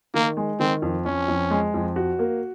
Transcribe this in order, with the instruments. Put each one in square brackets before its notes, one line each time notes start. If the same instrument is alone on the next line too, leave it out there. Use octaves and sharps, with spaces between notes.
[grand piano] D#3 [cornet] A#3
[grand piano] G#3
[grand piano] D#3 [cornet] C4
[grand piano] F2
[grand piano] F2 [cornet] C#4
[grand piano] F2
G#3
F2
F#4
A#3